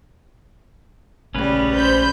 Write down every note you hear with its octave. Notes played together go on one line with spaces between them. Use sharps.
A#1 C#3 G3 A3 C#4 B4
C5 B5 G6